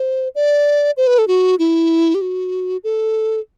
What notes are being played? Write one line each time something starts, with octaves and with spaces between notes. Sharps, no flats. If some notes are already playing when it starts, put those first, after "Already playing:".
Already playing: C5
D5
C5
B4
A4
F#4
E4
G4
F#4
A4